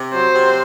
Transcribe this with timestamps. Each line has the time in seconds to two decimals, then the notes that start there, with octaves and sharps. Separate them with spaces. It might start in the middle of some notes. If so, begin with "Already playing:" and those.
Already playing: C3
0.14 F#3 C5
0.35 C3